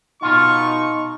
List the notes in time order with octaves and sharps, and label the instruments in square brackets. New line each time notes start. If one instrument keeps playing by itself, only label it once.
[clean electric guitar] B2 F4 [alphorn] D#4 [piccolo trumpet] C#6